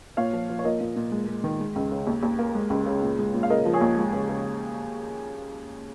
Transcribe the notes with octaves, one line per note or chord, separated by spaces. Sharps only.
A#2 C#5 F5
F3
F3
C#5
A#2 A#4 D#5
A#2
A#2
G#3
G#3
D#3
G#3
C#2
C#3
D#2
D#2
A#3
G#3
C#2
C#3
A#2
G#3
A#2
F5
C#3 A#4 D#5
F3
G#4 C#5
D#2
G#3
C#3
C#3